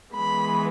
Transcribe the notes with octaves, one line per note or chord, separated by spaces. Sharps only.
E3 G#3 B3 B5